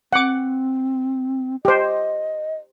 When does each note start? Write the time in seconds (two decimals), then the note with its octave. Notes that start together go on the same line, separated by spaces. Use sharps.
0.13 C4 F#5 D6
1.65 G4 C5 D#5